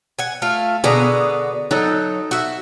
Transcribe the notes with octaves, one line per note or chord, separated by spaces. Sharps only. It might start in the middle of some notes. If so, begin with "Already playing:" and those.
F#5 G#5
A3 F4 F5
B2 D3 B3 G#4 A#5
F#3 D#4 A4
F#4 E5